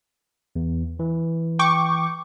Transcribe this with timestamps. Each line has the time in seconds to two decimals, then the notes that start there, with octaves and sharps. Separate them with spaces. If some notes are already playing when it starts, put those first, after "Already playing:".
0.56 E2
0.99 E3
1.59 G5 C#6 D6